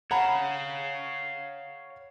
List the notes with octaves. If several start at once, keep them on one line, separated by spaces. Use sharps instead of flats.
C#5 F5 F#5 A#5 B5